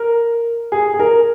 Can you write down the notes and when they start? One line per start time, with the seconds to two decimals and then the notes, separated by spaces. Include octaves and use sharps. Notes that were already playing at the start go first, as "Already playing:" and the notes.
Already playing: A#4
0.72 G#4
0.94 G#4
0.99 A#4